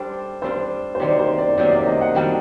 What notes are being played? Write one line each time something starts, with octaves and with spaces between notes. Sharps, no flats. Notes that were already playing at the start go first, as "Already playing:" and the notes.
Already playing: G3 D4 A4 C5
G3 D4 A4 C5
C5
C3 D#3 F#3 A#3 D5
C5
D5
C3 D#3 F#3 A#3 D5
D5
D#5
F#5
D#3 G3 D4 F#4 G5